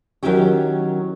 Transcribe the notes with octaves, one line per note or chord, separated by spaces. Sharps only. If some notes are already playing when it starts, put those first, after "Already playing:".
D#3 F#3 C#4 E4 G4 C#5